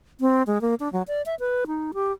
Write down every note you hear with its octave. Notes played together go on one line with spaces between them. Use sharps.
C4
G#3
A#3
D4
F#3
D5
E5
B4
D#4
G4